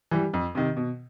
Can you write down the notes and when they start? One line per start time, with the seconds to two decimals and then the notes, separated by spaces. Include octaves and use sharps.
0.11 E3 G3
0.33 F2
0.55 C3 D#3
0.77 B2